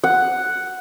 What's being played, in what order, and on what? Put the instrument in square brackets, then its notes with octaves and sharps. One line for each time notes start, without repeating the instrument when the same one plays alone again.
[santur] F#5